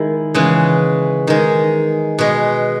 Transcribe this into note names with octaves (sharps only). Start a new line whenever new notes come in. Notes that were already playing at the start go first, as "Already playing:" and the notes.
Already playing: D#3 G#3 E4
C#3 E3 G#3
D#3 G#3
B2 G#3